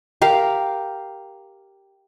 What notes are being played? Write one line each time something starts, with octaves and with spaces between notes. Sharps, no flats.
G4 A#4 F5